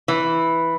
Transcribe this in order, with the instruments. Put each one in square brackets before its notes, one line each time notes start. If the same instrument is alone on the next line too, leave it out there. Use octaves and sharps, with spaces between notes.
[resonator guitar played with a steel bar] E3